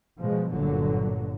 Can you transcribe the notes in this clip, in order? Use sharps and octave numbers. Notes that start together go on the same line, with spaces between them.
B2 F3 G#3
G1 A#2 D3 F#3